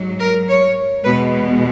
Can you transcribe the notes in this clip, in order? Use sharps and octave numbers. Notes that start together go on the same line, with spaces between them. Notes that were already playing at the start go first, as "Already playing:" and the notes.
Already playing: G#2 F#3
A#4
C#5
E2 B2 G#3 B4